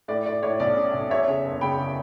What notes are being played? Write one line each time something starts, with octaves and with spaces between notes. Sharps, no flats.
A2 D5
A2 D5
A2 C#5
B1 D5
C#4
B1
E2 C#5 E5
C#3
F#1
C#3 G5 B5
C#3